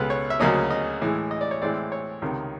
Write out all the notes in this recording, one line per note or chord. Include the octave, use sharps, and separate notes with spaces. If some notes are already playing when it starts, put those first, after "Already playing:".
Already playing: C#2 B2 G#3 A4 B4
C#5
E5
D2 C#3 F#3 A#3 C#4 D#5
D#5
A2 E3 G#3
D#5
D5
C#5
A2 E3 G#3 C4 D5
C#5
C#2 C3 D#3